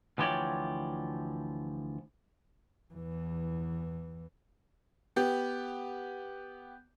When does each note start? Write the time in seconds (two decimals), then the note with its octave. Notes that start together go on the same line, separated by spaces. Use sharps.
0.18 D2 E3 F3 G4 C#5 D5
2.94 E2 E3
5.16 B3 G4